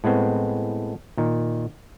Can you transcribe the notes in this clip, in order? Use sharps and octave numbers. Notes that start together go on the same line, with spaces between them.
A2 G#3 B3 C4
A#2 D#3